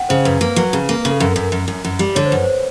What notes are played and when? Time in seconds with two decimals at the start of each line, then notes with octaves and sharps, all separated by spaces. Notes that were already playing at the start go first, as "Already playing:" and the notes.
Already playing: F#5 G5
0.09 C#3 C5
0.25 F#2 B4
0.41 A#3 B4
0.56 F#3 B4
0.73 C#3
0.89 A#3
1.05 C#3
1.11 A4
1.20 F#2 A#4
1.31 A#4
1.36 F#2
1.42 A#4
1.52 F#2
1.68 F#2
1.85 F#2
1.99 G3
2.15 D3 C#5
2.26 C5
2.32 F#2 B4
2.44 C5